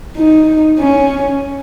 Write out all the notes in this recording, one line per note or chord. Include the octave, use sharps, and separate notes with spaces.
D#4
C#4